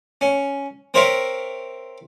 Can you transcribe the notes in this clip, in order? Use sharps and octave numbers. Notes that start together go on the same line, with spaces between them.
C#4
C4 A#4 C5 C#5 E5 F5